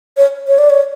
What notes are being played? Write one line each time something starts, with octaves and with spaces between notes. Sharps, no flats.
C#5
C#5
D5
C#5